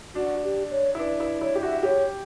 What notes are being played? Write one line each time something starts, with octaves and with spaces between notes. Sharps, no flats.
D4 F#4
G4
C#5
E4
D4 B4
E4 B4
E4 C#5
G4
F#4 E5
G4 C#5